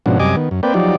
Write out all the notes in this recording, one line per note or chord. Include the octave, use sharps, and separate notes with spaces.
G#2 B2 F3 C#4 D4 F#4
F#2 C3 G3 D#5 G#5 D6
D#3 B3
F#2
A#3 C4 B4 D5 G5
F3 F#3 D#4 G4 D5